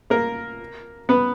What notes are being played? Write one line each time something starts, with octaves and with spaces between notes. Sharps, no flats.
A#3 A#4
B3 B4